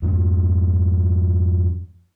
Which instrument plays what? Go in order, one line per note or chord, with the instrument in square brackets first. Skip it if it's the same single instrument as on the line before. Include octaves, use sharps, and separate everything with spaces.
[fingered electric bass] F2 G#2 F3